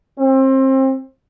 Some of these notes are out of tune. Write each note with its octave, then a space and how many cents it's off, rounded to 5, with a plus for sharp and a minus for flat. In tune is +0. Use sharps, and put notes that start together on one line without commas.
C4 +30